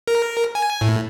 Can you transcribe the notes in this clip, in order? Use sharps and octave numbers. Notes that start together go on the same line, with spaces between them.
A#4
G#5
A2